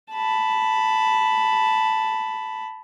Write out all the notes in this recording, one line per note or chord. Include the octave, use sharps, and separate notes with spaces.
A5 B5